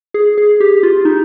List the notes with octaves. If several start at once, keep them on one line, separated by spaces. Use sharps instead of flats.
G#4
G#4
G4
F4
D#4